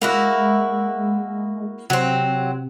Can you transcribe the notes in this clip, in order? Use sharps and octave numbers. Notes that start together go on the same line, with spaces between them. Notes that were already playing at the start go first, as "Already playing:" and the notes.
G#3 A#3 E4 F#4
C3 F#3 C4